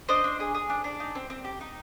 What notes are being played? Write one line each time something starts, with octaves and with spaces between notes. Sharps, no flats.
D4 C5 D#5
D4
G#4
G#4
D4
D4
D#4
C4
C4
G4
D#4